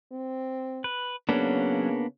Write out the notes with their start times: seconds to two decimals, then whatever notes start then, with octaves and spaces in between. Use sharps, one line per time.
0.12 C4
0.84 B4
1.29 C#3 F#3 A#3 B3 C#4 D4